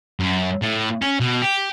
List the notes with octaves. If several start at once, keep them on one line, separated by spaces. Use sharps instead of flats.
F#2
A2
C#4
B2
G4